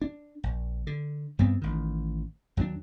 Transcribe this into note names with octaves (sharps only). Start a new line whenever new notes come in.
D4
A#1
D3
G2 G3 B3 C4
A1 D#3
D#2 F#3 B3 D4